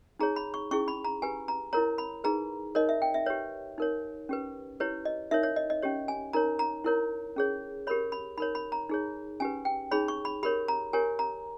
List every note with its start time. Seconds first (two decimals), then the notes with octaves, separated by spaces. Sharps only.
0.19 D#4 G#4 C#5 A#5
0.36 B5
0.54 C#6
0.71 C#4 E4 G#4 C#6
0.88 B5
1.04 A#5
1.22 G4 B4 G#5
1.48 A#5
1.73 E4 A#4 C#5 A#5
1.98 B5
2.24 D#4 G#4 B4 A#5
2.75 D#4 A#4 C#5 D#5
2.89 E5
3.02 G5
3.14 E5
3.26 G4 B4 C#5
3.78 D#4 A#4 C#5
4.29 C#4 G4 B4
4.80 E4 G4 B4 C#5
5.05 D#5
5.31 D#4 A#4 C#5 E5
5.43 C#5
5.56 D#5
5.70 D#5
5.82 C#4 G4 C#5
6.08 G#5
6.33 D#4 A#4 C#5 A#5
6.59 A#5
6.84 E4 A#4 C#5
7.36 C#4 G#4 C#5
7.87 G4 A#4 C#5 B5
8.12 B5
8.37 D#4 A#4 C#5 B5
8.55 B5
8.72 A#5
8.89 D#4 G#4 C#5
9.40 C#4 G4 B4 G#5
9.65 G5
9.91 D#4 G#4 C#5 B5
10.08 C#6
10.25 B5
10.43 G4 A#4 C#5 B5
10.68 A#5
10.93 G4 A#4 C#5 G#5
11.19 A#5